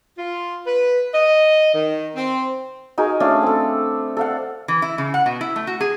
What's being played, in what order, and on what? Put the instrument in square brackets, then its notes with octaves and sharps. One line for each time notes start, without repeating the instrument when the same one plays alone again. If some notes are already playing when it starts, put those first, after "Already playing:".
[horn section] F4
B4
D#5
D#3
C4
[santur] D#4 F#4 G#4 A#4
A3 C#4 D4 F5
C4 A4
A4 F5 F#5
[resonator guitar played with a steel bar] E3
E4
C#3
F#5
B2
E4
A3
F#4
G#4